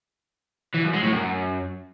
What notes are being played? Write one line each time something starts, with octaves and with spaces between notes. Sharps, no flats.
E3
F#2
G#3
A2
F#2